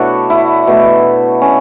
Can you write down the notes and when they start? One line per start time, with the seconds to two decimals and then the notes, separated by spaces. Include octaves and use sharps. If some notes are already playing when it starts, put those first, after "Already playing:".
Already playing: B2 A3 D4 E4 F#4 A4 C#5
0.30 E4
0.67 B2 A3
1.41 C#4